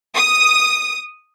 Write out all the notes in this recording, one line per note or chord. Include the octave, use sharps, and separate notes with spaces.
D#6